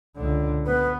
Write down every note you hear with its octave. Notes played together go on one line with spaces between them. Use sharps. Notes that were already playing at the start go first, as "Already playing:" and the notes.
C#2 D3
B3 B4